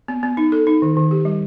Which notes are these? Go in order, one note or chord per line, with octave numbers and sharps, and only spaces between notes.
B3
B3
D#4
A4
D#4
D#3
D#3
G4
G3